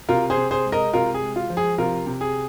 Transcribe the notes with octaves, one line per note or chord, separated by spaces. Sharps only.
C3 F4 A#4
G#4 C5
C3
G#4 C5
G#3
A#4 D#5
C3 F4 A#4
G#4
G#3
F4
F3
G#4
C3 F4 A#4
C3
G#4